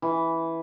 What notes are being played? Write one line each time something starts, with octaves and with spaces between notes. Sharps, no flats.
E3